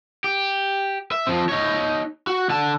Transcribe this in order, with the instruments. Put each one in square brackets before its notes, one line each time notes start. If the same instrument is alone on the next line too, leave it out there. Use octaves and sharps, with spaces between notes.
[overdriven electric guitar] G4
E5
F3 C4
D#4 C#5
F#4
D3 A5